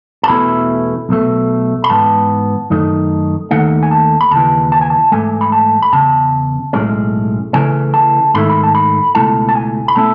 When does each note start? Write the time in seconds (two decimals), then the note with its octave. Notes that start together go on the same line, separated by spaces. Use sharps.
0.23 A5
0.28 E2 B2 A3 C#4 E4 B5
1.09 B1 B2 A3
1.84 B5
1.89 G#2 E3 B3 A5
2.70 F#2 D#3 A3 D#4
3.51 D#2 D#3 A3 D#4 F#5
3.83 G#5
3.91 A5
4.21 B5
4.31 D#2 C#3 E3 A5
4.72 A5
4.81 G#5
4.90 A5
5.12 G#2 E3 A3 G#5
5.41 B5
5.52 A5
5.82 B5
5.93 E2 C#3 A5
6.73 B1 A2 G#3 C#4
7.53 C#3 E3 A3 C#4 G#5
7.94 A5
8.34 G#2 D#3 A3 E4 B5
8.50 B5
8.63 A5
8.75 B5
9.15 C#2 B2 A3 E4 A5
9.49 A5
9.55 G#5
9.88 B5
9.96 B2 A3 C#4 E4 A5